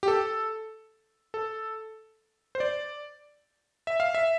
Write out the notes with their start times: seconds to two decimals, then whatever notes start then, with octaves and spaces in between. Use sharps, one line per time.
0.03 G4
0.08 A4
1.34 A4
2.55 C5
2.60 D5
3.87 E5
4.00 F5
4.15 E5